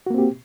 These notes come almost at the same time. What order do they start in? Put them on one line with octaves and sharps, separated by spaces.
F#4 A#3 C4 G4